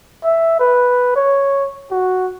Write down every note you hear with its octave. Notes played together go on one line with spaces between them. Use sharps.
E5
B4
C#5
F#4